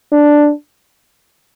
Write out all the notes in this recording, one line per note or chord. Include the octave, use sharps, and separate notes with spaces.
D4